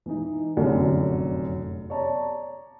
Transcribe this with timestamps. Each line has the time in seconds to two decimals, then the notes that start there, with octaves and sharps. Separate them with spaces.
0.06 E3 D#4
0.57 F1 F#2 A2 D3
1.90 C#5 D5 A5 A#5